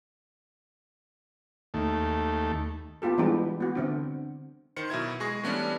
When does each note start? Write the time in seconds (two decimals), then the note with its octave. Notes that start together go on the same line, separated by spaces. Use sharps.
1.74 D#2 A3
3.02 B3 F4 G4 A4
3.18 E3 G3 G#3 B3 D4
3.60 B3 F#4
3.75 D3 C4 D4
4.76 D#3 C5 C#7
4.90 B2 F#3 E4 G#6
5.20 G#3 G#4 C#6 A#6
5.43 E3 G3 A3 B3 C#4 D4